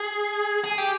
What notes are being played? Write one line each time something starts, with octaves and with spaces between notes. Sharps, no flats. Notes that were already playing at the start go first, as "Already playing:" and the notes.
Already playing: G#4
G#4
G4